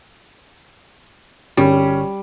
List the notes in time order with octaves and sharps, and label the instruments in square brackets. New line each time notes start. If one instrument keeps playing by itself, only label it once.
[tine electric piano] G1 [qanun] G3 [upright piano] C#4